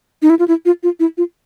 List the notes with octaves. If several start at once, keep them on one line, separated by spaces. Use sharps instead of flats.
D#4
E4
F4
E4
F4
F4
E4
F4